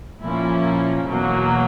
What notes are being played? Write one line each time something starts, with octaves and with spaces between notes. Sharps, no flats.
A#2 F3 A#3 C#4 E4
E2 B2 F#3 A#3